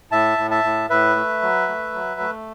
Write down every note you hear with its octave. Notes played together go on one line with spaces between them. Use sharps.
A2 E5 A5
A2
E5 A5
A2
A2 B4 E5
A3
F#3
A3
F#3
A3